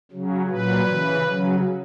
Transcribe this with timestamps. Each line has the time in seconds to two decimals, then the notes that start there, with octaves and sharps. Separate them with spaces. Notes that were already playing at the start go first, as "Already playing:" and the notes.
0.12 C#3 F#3
0.49 A#2 F#3 B4
0.87 C#3 E3
1.25 C#3 F#3